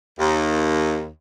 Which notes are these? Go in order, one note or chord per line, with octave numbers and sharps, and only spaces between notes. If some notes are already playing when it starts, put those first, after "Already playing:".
D#2